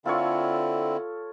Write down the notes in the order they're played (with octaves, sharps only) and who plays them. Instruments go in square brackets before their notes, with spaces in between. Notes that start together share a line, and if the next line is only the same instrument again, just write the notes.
[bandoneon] D3 C4 E4 [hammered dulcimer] F4 A4 C#5